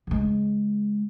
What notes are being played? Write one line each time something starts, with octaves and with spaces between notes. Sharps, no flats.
C#3 G#3